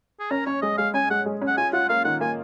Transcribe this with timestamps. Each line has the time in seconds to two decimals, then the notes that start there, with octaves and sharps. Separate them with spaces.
0.20 G#4
0.31 C#4 A#4
0.46 C#4 C#5
0.62 G#3 D#5
0.78 G#3 F5
0.94 C#4 G#5
1.10 G#3 F#5
1.26 G#3
1.42 C#4
1.47 F#5
1.57 F4 G#5
1.73 F4 F#5
1.89 A#3 F5
2.05 D#3 F#5
2.21 A#3 G#5